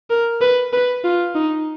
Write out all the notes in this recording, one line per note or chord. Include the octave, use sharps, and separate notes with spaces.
A#4
B4
B4
F4
D#4